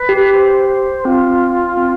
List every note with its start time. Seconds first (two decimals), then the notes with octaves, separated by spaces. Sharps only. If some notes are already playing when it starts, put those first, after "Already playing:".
Already playing: B4
0.09 G4
0.33 C5
0.69 C5
1.05 C4 F4
1.77 C4